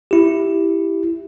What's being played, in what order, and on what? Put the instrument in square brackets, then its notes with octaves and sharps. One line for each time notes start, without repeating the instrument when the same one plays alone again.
[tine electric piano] E4 G4